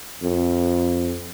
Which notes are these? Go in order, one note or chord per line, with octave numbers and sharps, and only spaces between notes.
F2